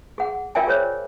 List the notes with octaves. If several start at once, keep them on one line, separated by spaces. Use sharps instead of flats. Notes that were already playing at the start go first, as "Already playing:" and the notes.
G#4 F#5
F4 A#4 D5 E5 G5 G#5
G#4 A#4 C5 C#5